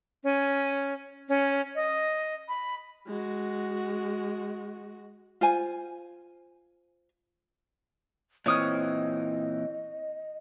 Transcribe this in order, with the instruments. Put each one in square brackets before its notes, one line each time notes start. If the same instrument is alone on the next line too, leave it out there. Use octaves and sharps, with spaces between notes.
[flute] C#4
C#4
D#5
B5
[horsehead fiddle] G#3 F#4
[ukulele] F4 C5 G#5
[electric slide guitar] A#2 E3 C4 [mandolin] C#5 D#6 F6 [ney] D#5